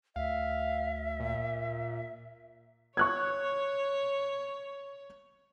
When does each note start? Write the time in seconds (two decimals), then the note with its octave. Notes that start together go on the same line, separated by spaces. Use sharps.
0.16 D2 E5 F5
1.20 A#2
2.97 C#5 C#6 F#6 G#6